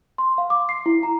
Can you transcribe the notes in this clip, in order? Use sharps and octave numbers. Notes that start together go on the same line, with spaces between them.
C6
F5
D6
C7
E4
A#5